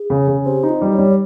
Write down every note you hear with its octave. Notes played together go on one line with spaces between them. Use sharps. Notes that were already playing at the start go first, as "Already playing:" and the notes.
Already playing: G#4
C#3
C#3
C4 G4
D#4
F4
G3
C#5
G3